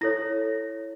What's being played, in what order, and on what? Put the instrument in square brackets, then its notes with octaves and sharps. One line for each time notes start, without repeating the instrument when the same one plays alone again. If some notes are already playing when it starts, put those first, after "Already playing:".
[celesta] E4 A4 C#5 A#6